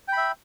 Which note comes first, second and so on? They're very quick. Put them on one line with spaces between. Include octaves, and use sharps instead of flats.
G5 B5 E5